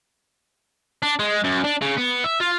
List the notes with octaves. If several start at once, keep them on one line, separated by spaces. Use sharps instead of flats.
D4
G#3
F#2
D4
C#3
B3
E5
F4